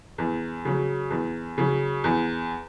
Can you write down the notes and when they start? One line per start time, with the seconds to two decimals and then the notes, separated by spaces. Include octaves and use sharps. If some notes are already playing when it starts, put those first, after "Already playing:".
0.18 E2
0.65 C#3 F#3
1.10 E2
1.58 C#3 F#3
2.04 E2